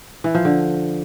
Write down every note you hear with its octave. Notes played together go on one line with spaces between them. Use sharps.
E3
F3
D3